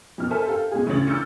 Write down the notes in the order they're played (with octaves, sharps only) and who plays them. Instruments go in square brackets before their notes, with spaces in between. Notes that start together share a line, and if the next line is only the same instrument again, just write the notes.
[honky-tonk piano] F2 B2 F6
A4 A#4 C5 E5 G#5 A5
G4 A4 F5
B2 G#3 G#4
A1 D2 C#3 C#5 A6 F#7
D6 E6 F6 G6 A6 C#7